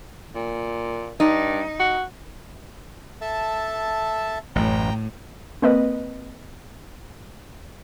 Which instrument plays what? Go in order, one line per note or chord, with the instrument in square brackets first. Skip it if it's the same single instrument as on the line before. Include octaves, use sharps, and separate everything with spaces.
[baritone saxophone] A#2
[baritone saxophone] G2 [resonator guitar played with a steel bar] D#4
[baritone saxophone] F#4
[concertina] A4 E5 A5
[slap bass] A1 F#2 [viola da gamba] A2 [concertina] G5 A#5
[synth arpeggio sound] A#3 C4 B4 D#5